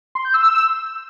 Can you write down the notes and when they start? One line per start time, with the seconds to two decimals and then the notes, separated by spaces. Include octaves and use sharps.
0.15 C6
0.25 G6
0.34 E6